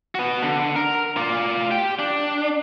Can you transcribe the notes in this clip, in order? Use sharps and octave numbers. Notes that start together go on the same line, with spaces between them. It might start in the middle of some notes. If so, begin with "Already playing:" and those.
B3 F#4
D3
A#4
F4 D5
G4 G5
D4